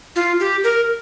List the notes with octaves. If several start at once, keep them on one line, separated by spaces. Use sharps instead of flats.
F4
G4
A#4